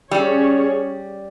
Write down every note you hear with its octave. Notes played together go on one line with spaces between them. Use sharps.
G3 C#4 G#4 C#5